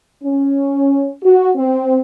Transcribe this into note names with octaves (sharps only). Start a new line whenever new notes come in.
C#4
F#4
C4